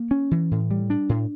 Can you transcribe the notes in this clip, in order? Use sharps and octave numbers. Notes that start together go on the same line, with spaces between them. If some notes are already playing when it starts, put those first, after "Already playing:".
Already playing: A#3
C#4
E3
A2
G3
D4
A2